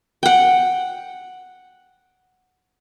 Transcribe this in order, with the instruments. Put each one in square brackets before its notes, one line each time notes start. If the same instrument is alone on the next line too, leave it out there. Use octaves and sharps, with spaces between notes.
[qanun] F#5 G5